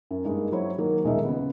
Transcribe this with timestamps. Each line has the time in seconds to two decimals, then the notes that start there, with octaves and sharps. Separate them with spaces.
0.11 F#2
0.25 G2 G#3 A#3 D#4
0.52 F#3 E4 C5 C#5
0.78 D#3 F#3 A#3
1.04 D#1 B1 G#3 A#3 D#4 E5
1.25 C#3 B3